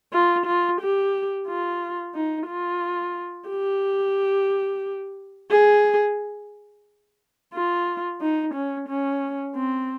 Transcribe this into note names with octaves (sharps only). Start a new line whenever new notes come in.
F4
F4
G4
F4
D#4
F4
G4
G#4
F4
D#4
C#4
C#4
C4